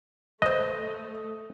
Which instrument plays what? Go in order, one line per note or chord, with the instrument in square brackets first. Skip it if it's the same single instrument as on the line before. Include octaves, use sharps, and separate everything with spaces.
[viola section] A3 [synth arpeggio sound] B4 C5 [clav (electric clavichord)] D#5 [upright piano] D#6